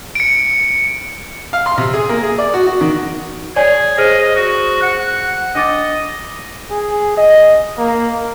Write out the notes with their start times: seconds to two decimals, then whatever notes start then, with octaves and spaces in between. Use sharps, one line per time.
0.15 C#7 D7
1.53 F5
1.66 C6
1.78 C3
1.94 G#4
2.09 A#3
2.23 G#4
2.38 D5
2.54 F#4
2.67 F#4
2.81 D#3
3.56 G#4 C#5 D5 G#5
3.98 G#4 C5 D#5 F6
4.19 D#5
4.36 F#4
4.83 F#5
5.55 D4 D#5 D6 A6
6.70 G#4
7.18 D#5
7.78 A#3